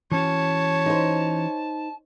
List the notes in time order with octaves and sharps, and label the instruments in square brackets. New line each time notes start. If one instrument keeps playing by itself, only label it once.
[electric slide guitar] E3 C#4 F#4 [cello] C#5 [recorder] A5
[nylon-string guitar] D#4 C5